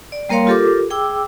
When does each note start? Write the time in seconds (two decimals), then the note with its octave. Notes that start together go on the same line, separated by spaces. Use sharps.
0.12 D5
0.29 G3 A#3 A#4 C#5 F5 C6
0.47 F4 G4 A4 A#4 D6
0.90 G#4 G5 D6 E6